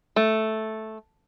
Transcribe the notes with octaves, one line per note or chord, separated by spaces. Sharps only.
A3